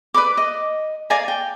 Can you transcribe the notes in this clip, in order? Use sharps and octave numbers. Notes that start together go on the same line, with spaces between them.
B4 D5 B5 D6
D#5
D5 F5 G#5 A#5
G5